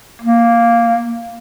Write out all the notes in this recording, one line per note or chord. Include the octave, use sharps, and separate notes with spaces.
A#3